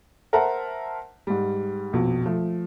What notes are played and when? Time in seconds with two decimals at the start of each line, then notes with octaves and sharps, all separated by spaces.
0.33 A#4 C5 E5 F#5 A5
1.27 G#2 G3
1.93 A#1 F2 B2
2.25 F3 A3